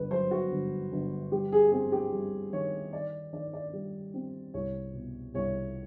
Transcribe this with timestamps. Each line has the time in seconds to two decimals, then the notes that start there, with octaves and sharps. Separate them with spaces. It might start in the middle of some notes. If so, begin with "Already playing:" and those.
Already playing: G1 B4
0.11 F#3 C5
0.31 F#4
0.51 G1
0.92 G1
1.32 G3 G4
1.52 G#4
1.72 C4 G#4
1.92 G4
2.13 G3
2.52 D#3 C#5
2.93 D#3 D5
3.33 D#3 D5
3.53 D5
3.73 G3
4.14 C4
4.54 C2 C#5
4.94 B2
5.34 C2 C#5